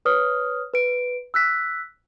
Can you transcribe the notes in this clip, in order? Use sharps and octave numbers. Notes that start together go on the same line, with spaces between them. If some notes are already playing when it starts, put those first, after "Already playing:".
B4 C#5 D#6 F6
B4 D7
E6 F#6 B6